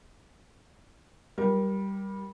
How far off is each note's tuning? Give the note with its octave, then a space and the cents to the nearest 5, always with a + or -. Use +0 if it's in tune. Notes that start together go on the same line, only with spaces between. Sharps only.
G3 -5 A#4 +20